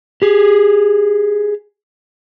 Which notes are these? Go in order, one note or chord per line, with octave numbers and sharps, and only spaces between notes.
G4 G#4